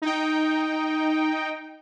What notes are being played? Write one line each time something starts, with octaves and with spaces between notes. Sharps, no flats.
D#4 G5